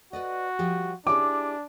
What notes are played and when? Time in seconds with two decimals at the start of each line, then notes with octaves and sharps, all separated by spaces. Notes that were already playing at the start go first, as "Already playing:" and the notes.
0.13 F#4 B4 D5 D#5
0.59 F3 G3 G4
1.07 D4 E4 G4 G#4 D6